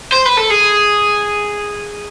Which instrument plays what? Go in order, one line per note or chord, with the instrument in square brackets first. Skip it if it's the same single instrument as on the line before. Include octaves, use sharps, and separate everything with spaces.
[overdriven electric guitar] C5
B4
A4
G#4